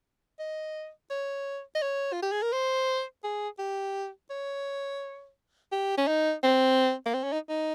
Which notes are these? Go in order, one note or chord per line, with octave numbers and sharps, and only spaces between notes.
D#5
C#5
D#5
C#5
F4
G4
G#4
A#4
C5
G#4
G4
C#5
G4
C#4
D#4
C4
A#3
C4
C#4
D#4
D#4